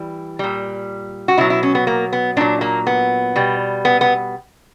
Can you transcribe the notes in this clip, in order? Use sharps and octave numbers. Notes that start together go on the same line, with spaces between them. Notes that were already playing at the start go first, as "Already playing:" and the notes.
Already playing: E3 G3
A#2 G3
F#4
B2 F#3 E4
E4
C#4
B3
A#3
B3
A#2 F#3 D4
A#3
B3
B2 G3
B3
B3